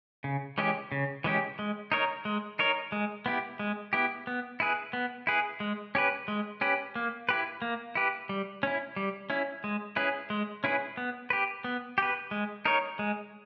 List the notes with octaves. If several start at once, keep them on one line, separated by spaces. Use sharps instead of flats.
C#3
E3 G#3 C#4 G4
C#3
E3 G#3 C#4 G4
G#3
D#4 A#4 C#5
G#3
D#4 A#4 C#5
G#3
B3 E4 G4
G#3
B3 E4 G4
B3
E4 G#4 B4
B3
E4 G#4 B4
G#3
C#4 G4 B4
G#3
C#4 G4 B4
A#3
E4 G4 B4
A#3
E4 G4 B4
G3
C#4 E4
G3
C#4 E4
G#3
C#4 E4 G#4 B4
G#3
C#4 E4 G#4 B4
B3
G4 B4
B3
G4 B4
G#3
D#4 A#4 C#5
G#3